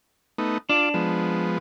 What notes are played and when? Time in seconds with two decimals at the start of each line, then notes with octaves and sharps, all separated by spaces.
0.38 A3 B3 D#4
0.70 D4 F4 D5
0.94 F3 G#3 B3